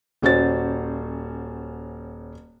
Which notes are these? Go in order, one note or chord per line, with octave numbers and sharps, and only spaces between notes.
D#1 C#4 F#4 C5 A6